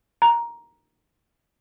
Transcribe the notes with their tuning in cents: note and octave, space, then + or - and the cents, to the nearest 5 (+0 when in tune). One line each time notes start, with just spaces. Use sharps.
A#5 +10